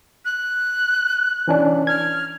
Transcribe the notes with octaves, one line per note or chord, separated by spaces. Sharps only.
F#6
E3 C#4 D4
F6 G#6